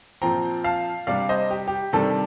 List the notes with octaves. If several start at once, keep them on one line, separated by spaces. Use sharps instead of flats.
A#2 F3 C4 G5 A#5
F5 A5
C3 G3 D4 D5 F5
C5 D#5
G4
G4
C3 D#3 G3 D4 A4